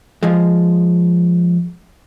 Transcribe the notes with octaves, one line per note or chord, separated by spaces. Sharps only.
F3 G#3